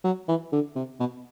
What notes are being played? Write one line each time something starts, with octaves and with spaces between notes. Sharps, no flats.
F#3
E3
D3
C3
B2